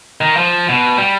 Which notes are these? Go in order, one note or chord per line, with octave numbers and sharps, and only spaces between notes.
D#3
F3
B2
G3